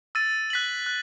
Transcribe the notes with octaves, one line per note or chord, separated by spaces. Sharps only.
E6 A6 D#7
F#6 B6 F#7
F#6